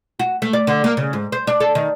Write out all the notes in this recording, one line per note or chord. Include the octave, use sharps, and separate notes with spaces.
F#4
A3
D5
D3
A#3
C#3
G#2
C5
D4
A4
D#3